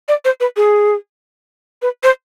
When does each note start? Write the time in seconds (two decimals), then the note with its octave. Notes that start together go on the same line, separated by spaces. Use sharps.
0.08 D5
0.25 C5
0.40 B4
0.57 G#4
1.82 B4
2.03 C5